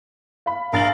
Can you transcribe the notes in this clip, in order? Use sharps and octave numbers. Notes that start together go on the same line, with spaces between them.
F5 B5
A#1 A#4 F5 A6 F#7